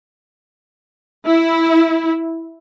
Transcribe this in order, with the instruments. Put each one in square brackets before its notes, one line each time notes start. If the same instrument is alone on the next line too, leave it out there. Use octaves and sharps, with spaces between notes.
[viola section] E4